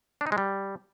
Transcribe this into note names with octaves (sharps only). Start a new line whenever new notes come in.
D4
D#4
G#3
G3